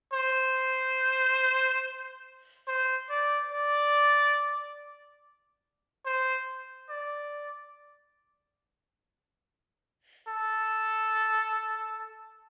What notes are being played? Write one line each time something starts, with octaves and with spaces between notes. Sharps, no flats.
C5
C5
D5
D5
C5
D5
A4